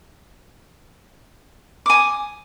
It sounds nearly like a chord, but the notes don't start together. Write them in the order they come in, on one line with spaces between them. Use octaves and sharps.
D6 G#5 D#6